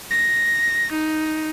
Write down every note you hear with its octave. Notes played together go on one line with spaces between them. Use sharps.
A#6
D#4